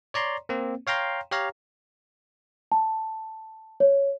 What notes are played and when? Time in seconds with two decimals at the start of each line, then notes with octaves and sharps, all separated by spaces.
0.14 C#5 D5 A#5 C6
0.49 A#3 C4
0.87 C#5 F5 G5 A#5 C6
1.31 G4 C#5 F5 A#5
2.72 A5
3.80 C#5